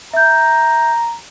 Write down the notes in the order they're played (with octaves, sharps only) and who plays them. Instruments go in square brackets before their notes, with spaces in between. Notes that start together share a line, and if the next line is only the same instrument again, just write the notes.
[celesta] E5 G6 [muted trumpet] A#5